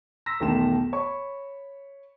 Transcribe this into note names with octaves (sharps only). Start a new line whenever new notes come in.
A#5 C6 E6 A#6 B6
B1 E2 D#3 A3 C6 E7
C#5 B5 C#6